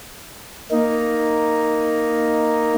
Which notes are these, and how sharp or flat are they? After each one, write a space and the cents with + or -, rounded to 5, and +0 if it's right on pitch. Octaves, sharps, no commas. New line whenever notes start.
A#3 +0 D#4 +0